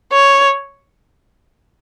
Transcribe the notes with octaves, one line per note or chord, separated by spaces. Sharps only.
C#5